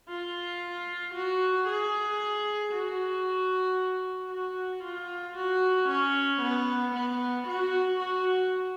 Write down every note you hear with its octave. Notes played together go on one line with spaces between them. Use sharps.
F4
F#4
G#4
F#4
F#4
F4
F#4
C#4
B3
B3
F#4
F#4